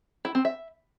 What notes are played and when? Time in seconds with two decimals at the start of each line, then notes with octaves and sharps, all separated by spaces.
0.25 E4
0.35 C4
0.45 E5